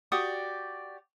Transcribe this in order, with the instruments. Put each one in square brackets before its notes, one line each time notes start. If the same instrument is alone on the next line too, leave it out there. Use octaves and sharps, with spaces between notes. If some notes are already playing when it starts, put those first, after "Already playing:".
[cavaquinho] F#4 G4 D5 D#6